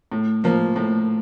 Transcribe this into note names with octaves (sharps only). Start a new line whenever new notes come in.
A2
F3 A#3
A2